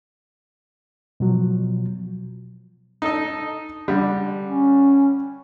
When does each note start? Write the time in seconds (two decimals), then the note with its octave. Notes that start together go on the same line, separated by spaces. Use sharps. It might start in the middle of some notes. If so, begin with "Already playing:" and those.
1.20 B2 F3 F#3
3.02 D#4 A4 D#5
3.88 D3 G3
4.45 C#4